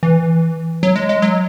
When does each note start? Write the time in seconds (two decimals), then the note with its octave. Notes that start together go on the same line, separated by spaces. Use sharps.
0.03 E3
0.83 F#3
0.96 G#3
1.09 G#3
1.22 F#3